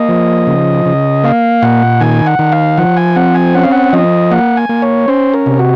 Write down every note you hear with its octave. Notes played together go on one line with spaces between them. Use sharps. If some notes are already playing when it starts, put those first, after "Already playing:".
Already playing: A#3 D#5
F3
C#3
C#3
A#3 F5
A#2 F#5
D#3 G#5
F#5
D#3
F5
F3 F#5
G#5
C4 F#5
G#5
C#4 F#5
F5
F#5
F3 D#5
A#3 F#5
G#5
A#3
C#5
C#4 C5
A#4
C3
F#4